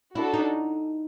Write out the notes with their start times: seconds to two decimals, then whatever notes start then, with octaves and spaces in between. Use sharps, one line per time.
0.15 D4 E4 F#4 A4
0.34 D#4